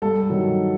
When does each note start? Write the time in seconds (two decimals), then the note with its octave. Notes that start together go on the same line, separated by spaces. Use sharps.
0.02 G2 A4
0.30 D#3 F#3